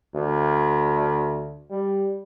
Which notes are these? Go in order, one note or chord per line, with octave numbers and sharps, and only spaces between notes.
D2
G3